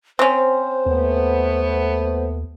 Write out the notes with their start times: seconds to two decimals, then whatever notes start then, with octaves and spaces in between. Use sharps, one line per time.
0.19 C4 C#4 C5
0.86 D#2 A3 B3